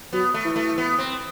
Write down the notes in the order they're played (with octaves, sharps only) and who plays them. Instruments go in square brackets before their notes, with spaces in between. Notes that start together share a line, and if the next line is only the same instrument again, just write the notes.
[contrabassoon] F#3 [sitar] B3
[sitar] A3
[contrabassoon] E3
[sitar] A3
B3
C4